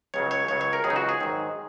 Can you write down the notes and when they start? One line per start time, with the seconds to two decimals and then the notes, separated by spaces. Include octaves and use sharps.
0.14 C#2 C#3 F#3 C#5
0.31 C#5
0.48 C#2 C#3 F#3 C#5
0.61 C#5
0.73 A#4
0.84 C#2 C#3 F#3 G#4
0.90 D#4
0.96 F#4
1.09 G#4
1.20 G#2 D#3 F#3